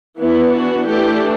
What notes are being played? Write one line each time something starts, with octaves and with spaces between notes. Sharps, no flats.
E3 B3 D4 E4
F#4
E3 A3 D4 G4